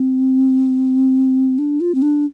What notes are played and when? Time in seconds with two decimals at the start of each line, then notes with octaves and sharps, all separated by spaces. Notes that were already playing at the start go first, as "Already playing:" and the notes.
Already playing: C4
1.59 D4
1.81 F4
1.95 C4
2.02 D4